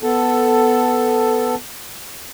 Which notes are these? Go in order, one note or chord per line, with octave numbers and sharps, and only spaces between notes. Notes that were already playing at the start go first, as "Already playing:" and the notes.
B3 A4